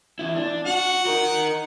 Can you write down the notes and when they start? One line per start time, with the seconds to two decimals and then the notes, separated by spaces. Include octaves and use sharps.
0.19 E2 E4
0.36 D4
0.67 F#4 F#5
1.07 D#4 A#4